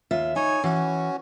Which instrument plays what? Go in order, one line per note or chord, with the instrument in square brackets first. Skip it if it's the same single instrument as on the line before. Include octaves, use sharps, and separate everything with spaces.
[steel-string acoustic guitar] D#2 F4 E5
[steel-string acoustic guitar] D#4 [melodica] C#5 G#5
[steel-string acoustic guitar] E3 [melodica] C#4 F#4